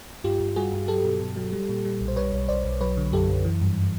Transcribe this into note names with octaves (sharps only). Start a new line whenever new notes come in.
G2 F4 G4
G2
G3 F#4 G#4
G2
F#3 G4 A4
B2
B2
F#3
G3
A#2
G3
B1
C5
G3 B4 C#5
B1
B1 C5 D5
B1
F#3 B4 C#5
D3
F#2 G4 A4
F#2
E3
G2